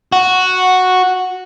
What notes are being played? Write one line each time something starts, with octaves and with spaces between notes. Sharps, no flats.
F#4